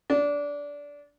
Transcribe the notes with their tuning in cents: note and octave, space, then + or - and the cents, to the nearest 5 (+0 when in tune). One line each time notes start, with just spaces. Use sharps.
D4 -20